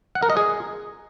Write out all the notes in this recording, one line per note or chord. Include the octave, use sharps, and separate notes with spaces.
F#5
A#4
D#5
G#4